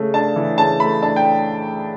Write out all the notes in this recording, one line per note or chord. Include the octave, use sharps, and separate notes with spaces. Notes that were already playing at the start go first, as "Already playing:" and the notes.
Already playing: C#3 A3
D4 A5
E3
C#3 A5
A3 B5
D4 A5
G5